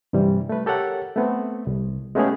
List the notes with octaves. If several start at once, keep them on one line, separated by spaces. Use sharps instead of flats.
G2 C3 E3 G3
A3 B4
G4 A4 A#4 C#5 F#5
A3 B3 C4
C2
G#3 A3 B3 C#4 G4 G#4